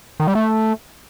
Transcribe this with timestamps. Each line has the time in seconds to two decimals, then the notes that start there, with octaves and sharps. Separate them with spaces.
0.20 D#3
0.27 G3
0.35 A3